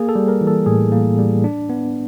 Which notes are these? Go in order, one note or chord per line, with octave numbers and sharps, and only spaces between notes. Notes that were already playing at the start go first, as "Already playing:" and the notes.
Already playing: A#3 G#4
A4
G3
A#4
E3
A4
A2 G#4
A#3
G3
D4
B3